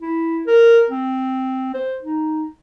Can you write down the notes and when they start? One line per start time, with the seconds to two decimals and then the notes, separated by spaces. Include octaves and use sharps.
0.01 E4
0.47 A#4
0.90 C4
1.74 C5
2.02 D#4